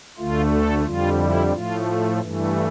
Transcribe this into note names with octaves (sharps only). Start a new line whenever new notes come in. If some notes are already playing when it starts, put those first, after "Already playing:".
D2 D3 A3 F4
A4
F2 D3 G3 F4
E4
A2 F3 A3 F4
G2 E3 A3